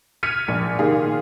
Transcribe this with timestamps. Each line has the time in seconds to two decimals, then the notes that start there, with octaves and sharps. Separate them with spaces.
0.23 F6 G#6 B6 C#7 D#7
0.48 A#1
0.79 A#2 D#3 G#4 F5